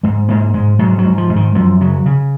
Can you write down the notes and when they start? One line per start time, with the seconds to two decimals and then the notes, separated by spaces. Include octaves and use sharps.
0.03 G#2 G#3
0.29 G#2 A#3
0.54 G#2 G#3
0.79 G#2 F#3
0.99 F#3
1.05 G#2
1.18 F3
1.29 G#2
1.36 D#3
1.55 F#2 F3
1.81 C#3 F#3
2.06 C#3